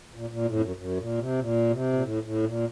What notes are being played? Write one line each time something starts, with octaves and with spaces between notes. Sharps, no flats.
A#2
A#2
A2
F2
F#2
F#2
A#2
C3
A#2
C3
A#2
A2
A2
A#2